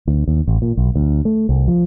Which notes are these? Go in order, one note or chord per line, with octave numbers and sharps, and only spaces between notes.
D2
D#2
A1
A#2
B1
D2
A3
C2
F3